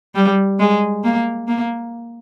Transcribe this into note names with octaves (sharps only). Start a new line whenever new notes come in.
G3
G#3
A#3
A#3